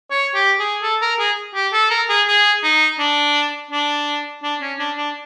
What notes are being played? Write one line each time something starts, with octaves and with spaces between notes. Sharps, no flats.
C#5
G4
G#4
A4
A#4
G#4
G4
A4
A#4
G#4
G#4
D#4
D4
D4
D4
C#4
D4
D4